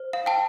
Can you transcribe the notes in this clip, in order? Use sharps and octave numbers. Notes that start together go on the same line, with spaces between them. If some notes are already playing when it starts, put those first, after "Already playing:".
Already playing: C5
F5
G5 A5